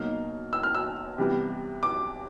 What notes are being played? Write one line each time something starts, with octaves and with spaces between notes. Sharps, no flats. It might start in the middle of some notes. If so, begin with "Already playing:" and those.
Already playing: B2 F#3 A#3 D#4 F6
E6
F6
E6
C3 E3 G3 B3
D6